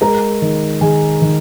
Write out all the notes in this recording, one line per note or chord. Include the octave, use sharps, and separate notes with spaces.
G#3 A#4 A#5
D#3
D#3 G#4 G#5
D#3